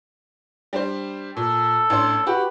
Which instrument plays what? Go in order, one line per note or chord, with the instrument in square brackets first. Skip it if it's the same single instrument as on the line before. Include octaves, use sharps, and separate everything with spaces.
[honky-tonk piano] G3 D4 C5
[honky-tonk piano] A#2 [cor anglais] A4
[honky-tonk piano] A1 D4 C6
[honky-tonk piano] F#4 G4 [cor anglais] B4